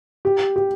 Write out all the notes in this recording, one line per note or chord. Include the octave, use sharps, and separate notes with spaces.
G4
G4